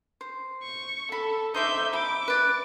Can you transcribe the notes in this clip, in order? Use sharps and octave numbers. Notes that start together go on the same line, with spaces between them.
C5
C#6
A4 B5
D#4 C5 E5 D6 G6
B5 D6
B4 D5